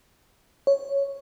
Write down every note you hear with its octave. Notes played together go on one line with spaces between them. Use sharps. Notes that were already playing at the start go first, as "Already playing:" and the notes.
C#5